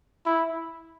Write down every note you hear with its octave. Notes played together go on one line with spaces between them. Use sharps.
E4